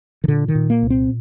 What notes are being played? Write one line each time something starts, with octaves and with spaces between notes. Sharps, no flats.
D#3
A#2 D3
D#3
A#2
A#3
C2
C4